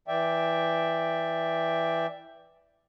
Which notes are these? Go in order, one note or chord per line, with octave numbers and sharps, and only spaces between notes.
E3 D5 E5 G5